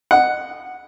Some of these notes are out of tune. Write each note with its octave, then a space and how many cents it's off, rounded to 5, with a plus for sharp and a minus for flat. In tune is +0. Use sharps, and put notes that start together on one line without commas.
D#5 -30 F#5 +0